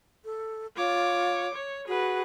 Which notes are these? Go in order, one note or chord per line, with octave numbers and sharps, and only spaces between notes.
A4
F4 C#5 D6
C#5
F#4 G#4 B4